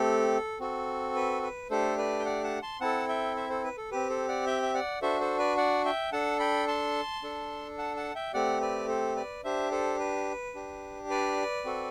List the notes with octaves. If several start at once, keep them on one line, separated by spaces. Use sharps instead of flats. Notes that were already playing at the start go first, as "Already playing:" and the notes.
Already playing: A3 C4 G4 A4
C4 F#4 A4
B4
B4
A3 D4 G4 A4 C5
B4 D5
G5
D5 F#5
F#5 A5
A5 C6
C4 E4 A4 F#5 A5
E5 G5
C5 E5
A4 C5
B4
A4
C4 G4 B4
A4 C5
D5 F#5
E5 G5
E5
D5 F#5
D4 F#4 A4 C5 E5
A4 C5
B4 D5
D5 F#5
E5 G5
D4 A4 F#5 A5
G5 B5
A5 C6
D4 A4
F#5 A5
F#5 A5
E5 G5
A3 C4 G4 D5 F#5
B4 D5
A4 C5
B4 D5
D4 G4 C5 E5
A4 C5
B4
D4 G4
B4 D5
C4 F#4 A4